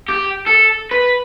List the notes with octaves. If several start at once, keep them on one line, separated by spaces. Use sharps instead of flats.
G4
A4
B4